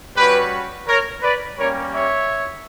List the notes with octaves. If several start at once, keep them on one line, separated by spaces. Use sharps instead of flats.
G3 C#4 F#4 G4 B4
A#4 C#5
B4 D5
G3 A#3 C#4 G4 A#4 C#5
C#5 E5